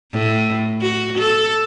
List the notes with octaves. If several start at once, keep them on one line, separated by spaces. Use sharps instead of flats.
A2
F#4
A4